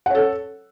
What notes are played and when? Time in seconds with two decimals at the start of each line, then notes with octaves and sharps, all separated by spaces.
0.06 F#5
0.10 C#5
0.15 A4